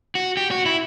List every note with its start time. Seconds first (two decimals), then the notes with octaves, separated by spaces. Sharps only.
0.15 F#4
0.37 G4
0.51 F#4
0.66 E4